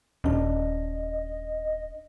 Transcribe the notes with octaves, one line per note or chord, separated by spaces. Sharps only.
D#1 C#4 D4 D#5